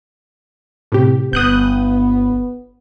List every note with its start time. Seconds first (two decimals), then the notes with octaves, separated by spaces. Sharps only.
0.92 A2 C3 G4
1.33 G1 B3 D#6 F#6 G6